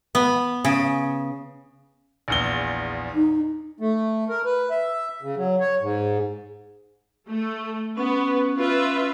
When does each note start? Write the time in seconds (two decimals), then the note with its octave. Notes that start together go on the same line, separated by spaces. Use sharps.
0.15 B3
0.65 C#3
2.28 A#1 E2 G7
3.15 D#4
3.80 A3
4.29 A#4
4.45 B4
4.70 E5
5.23 C#3
5.37 F#3
5.60 C#5
5.81 G#2
7.28 A3
7.97 B3 C#4 B4
8.57 F4 B4 E5